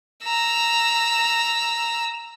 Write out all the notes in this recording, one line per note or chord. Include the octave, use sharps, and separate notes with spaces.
A#5 E6